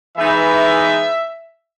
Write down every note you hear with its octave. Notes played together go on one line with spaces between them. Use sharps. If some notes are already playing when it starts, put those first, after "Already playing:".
E3 G#3 B3 D#4 E5